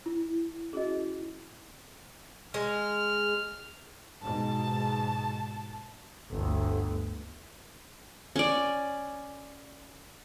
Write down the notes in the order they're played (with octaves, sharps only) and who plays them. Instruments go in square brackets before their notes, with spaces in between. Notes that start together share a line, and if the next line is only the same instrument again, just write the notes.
[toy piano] E4
[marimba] C#4 E4 F#4 [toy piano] G#4 D#5
[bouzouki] G#3 [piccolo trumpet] F6
[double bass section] G#2 B2 [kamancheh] A5
[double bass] G1 D2
[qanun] C#4 D5